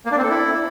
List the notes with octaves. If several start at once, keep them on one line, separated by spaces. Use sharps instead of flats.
A#3
D4
C4
A4
E4